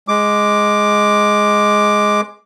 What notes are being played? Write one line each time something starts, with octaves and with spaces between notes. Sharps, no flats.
G#3 D6